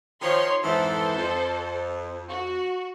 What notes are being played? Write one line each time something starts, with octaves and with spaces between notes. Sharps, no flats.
D#3 F3 C#5 C6
F2 G#2 E3 A4 C5
F2
F#4